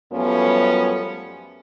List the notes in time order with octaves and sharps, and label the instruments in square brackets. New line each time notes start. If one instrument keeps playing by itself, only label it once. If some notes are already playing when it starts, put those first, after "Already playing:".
[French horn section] F#2 F3 G3 A3 B3 C#4